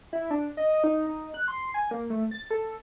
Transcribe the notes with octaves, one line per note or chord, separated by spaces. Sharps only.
E4
D4
D#5
D#4
D#4
F#6
C6
G#5
A#3
A3
A6
A4